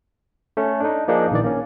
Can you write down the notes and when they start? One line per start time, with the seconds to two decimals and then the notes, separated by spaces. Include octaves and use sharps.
0.57 A3 C#4
0.80 D4 D#4
1.08 F3 A#3 D4 D#4 G#4
1.31 A#1 D#3 E3 D5
1.44 A#3 C#4